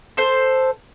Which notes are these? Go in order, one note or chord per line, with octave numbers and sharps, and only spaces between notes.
A4 C5